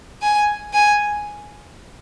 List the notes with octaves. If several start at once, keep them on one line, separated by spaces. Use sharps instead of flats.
G#5
G#5